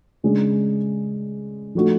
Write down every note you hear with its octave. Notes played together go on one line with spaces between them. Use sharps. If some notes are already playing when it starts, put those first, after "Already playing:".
C#3 G#3 D4 G#4
F3 A3 D4 F#4